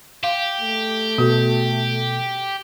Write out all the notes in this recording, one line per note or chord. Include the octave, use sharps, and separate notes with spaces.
G4 F5
A3
B2 F#4 A4